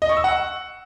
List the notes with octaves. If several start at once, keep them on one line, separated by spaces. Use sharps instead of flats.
D#5
C#6
E6
F#5